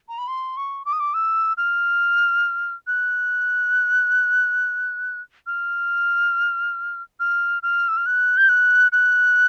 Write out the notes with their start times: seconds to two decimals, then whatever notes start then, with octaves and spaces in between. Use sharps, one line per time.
0.08 A#5
0.18 B5
0.28 C6
0.57 C#6
0.85 D6
0.93 D#6
1.00 D6
1.14 E6
1.57 F6
2.87 F#6
5.47 F6
7.20 F6
7.63 F6
7.88 E6
7.97 F6
8.06 F#6
8.37 G6
8.49 F#6
8.92 F#6